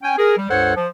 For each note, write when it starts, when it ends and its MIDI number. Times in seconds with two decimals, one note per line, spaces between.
0.03 0.14 61
0.03 0.14 79
0.03 0.14 80
0.18 0.34 68
0.18 0.34 70
0.37 0.46 55
0.50 0.74 37
0.50 0.74 43
0.50 0.74 69
0.50 0.74 72
0.50 0.74 73
0.50 0.74 78
0.76 0.88 53